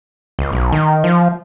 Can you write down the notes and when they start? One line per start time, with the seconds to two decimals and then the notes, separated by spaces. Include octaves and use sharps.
0.39 C#2
0.53 B1
0.72 D#3
1.04 F3